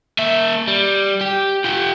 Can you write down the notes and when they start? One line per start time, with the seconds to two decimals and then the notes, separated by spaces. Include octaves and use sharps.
0.19 A#3 E5
0.68 G3
1.21 G4
1.64 F4 G4